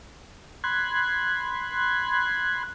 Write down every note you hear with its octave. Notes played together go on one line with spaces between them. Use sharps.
B5 C6 F#6 G#6